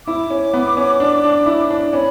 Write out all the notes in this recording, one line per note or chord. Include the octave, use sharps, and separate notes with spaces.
E4 D6
C#4
B3
C#4
D4
D4
E4
D4
C#4 B5